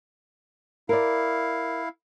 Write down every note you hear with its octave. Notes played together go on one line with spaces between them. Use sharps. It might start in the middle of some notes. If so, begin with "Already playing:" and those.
E4 A#4 D5 F5